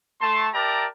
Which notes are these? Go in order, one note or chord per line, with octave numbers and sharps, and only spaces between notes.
A3 A5 C6
G4 A#4 D5 E5 A5 A#5